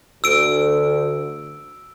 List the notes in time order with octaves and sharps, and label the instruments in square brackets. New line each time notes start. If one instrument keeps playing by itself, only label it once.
[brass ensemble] D2 [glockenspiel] E6 D7